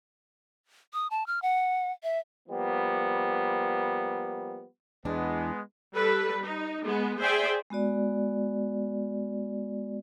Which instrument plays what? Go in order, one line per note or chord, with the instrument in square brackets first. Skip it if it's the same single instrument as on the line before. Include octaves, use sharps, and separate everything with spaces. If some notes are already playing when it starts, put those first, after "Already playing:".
[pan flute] D#6
A5
F6
F#5
E5
[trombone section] F3 G3 A#3 B3
[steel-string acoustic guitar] E2 D4 [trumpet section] G#3 B3
[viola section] G3 A4 B4
D#4
G#3 B3
G#4 C5 D5 E5 G5 G#5
[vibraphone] G#3 B3 F#4 D5